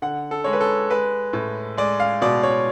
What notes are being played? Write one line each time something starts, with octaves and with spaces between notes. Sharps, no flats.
D3 F#5
A4
G#3 C#5
B4
A4
G#3 B4
A2
G#3 D5
F5
B2 D5
C#5